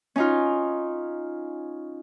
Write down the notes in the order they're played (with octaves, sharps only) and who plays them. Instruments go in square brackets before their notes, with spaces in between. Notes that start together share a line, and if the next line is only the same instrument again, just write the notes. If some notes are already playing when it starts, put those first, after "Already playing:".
[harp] C#4 D#4 F4